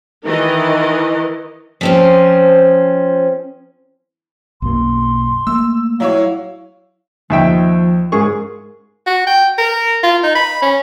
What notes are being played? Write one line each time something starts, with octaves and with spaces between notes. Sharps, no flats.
D#3 E3 A#4 D#5
F3 C4 C#4
B1 F#2 A#3 C6
A3 A#3 E6
F#3 E4 C#5 F5
D#2 F3 E5 G5
G#2 G#4 A#4 C#6
F#4
G5
A#4
F4
D#4
B5
C#4